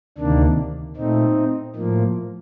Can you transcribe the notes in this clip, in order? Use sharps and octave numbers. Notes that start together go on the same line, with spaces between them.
D2 C3 D#3 A#3 D4
A#2 A3 C4 D#4
A2 F3 A#3